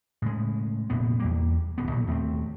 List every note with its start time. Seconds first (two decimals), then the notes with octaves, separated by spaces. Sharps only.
0.22 A2 C#3 G#3
0.90 F1 A#2 B3
1.20 E2 G3 A#3
1.78 D1 B3
1.91 B1 A#2
2.07 D#2 A3 B3 C4